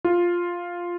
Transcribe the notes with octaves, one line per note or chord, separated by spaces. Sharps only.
F4